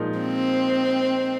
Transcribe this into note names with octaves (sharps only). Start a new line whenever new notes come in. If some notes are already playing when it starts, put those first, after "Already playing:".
Already playing: A#2 F3 G#3 D#4
C4